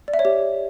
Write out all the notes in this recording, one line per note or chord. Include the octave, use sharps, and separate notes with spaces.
D5
E5
C#5
G4